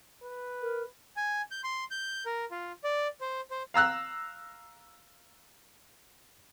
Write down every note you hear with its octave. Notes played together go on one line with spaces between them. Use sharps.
B4
A#4
G#5
G6
C6
G6
A#4
F4
D5
C5
C5
F5 A#5 E6 F#6